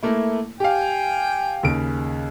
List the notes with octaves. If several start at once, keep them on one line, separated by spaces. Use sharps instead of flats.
A3 A#3 E4
G4 F5 G5 G#5
D#2 C#3 D7